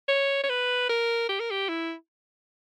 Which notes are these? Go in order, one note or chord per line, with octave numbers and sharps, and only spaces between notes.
C#5
C#5
B4
A#4
G4
A#4
G4
E4